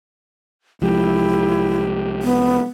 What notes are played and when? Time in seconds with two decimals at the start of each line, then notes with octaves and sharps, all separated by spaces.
0.81 C2 F3 G#3 E4 G4
2.23 B3